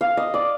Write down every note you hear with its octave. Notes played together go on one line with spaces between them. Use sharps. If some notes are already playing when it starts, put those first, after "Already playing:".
F5
D#5
D5